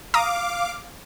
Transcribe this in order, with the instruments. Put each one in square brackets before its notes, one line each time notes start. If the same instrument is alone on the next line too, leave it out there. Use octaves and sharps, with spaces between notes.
[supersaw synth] F5 D6 [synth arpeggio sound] A#5 D#6